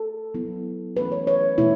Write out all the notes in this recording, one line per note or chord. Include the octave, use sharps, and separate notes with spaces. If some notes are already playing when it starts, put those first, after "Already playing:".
Already playing: A4
F#3 B3 E4
E3 A3 C#4 B4
C#5
C#5
B2 A3 E4